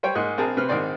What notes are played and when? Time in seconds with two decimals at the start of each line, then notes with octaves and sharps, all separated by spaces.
0.03 G3 C5 C#5 G5
0.15 G#2 A#3 G#4 D#5 C6 F#6
0.38 A#1 C4 G#4 A#4 A5
0.57 C3 B4 C5 F6
0.69 A#1 G#2 D#3 C4 D5 C6